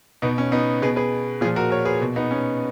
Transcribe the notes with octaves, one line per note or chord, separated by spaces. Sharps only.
B2 B3 D#4
C#4
B3 D#4
B2 G#4 B4
G#4 B4
A#2 F3 F4 G#4
F#4 A#4
A#4 C#5
G#4 B4
B2
B3 D#4
C#4